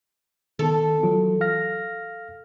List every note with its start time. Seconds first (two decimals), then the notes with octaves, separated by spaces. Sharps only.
0.59 D#3 B3 A4
1.03 E3 F#3 F4
1.41 F5 F6 A#6